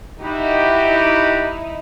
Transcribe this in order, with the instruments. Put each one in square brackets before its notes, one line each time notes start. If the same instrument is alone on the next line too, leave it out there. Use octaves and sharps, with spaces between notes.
[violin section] D#4 E4 [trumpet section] F#4 G4